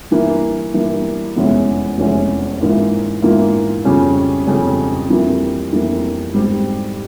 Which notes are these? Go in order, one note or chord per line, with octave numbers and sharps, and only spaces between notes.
G2 E3 A#3
G2 E3 A#3
F1 E2 E3 G#3 C#4
F1 E2 E3 G#3 C#4
G#2 E3 A#3 F4
G#2 E3 A#3 F4
F2 C#3 G3 C#4
F2 C#3 G3 C#4
F2 E3 G3 A#3
F2 E3 G3 A#3
G#2 G3 C4 G4